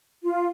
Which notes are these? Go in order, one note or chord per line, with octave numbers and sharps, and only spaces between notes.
F4